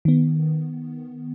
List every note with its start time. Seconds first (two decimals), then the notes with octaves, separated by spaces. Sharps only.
0.05 D#3 B3